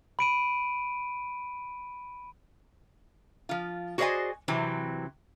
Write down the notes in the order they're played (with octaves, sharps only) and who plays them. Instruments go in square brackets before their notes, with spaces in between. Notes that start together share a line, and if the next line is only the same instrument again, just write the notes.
[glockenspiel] B5 D7 D#7
[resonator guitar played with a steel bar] F3 F4
F#4 G#4 C5 D5 D#5 G#5
C3 E3 F#3 C4